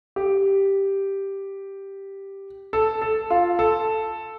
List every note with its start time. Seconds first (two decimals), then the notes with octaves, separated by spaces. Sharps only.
0.16 G4
2.73 A4
3.02 A4
3.30 F4
3.59 A4